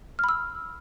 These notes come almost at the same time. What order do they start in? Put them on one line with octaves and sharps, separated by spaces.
F6 B5 E6